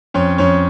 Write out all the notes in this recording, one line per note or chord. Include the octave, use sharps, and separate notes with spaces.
F2 C#4 C#5
F2 C#4 C#5